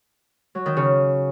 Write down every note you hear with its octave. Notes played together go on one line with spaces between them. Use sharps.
F#3
D#3
C#3